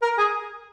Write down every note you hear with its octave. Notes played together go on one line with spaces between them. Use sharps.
A#4
G#4